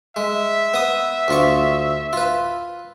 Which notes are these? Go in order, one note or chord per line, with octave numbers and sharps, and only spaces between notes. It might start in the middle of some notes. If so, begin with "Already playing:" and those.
G#3 E5
B3 D#6
D2 F4 C#6
F4 B4